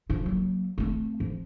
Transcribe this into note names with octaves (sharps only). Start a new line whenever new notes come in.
F3 F4
F#3 A#3
A3 C4
F3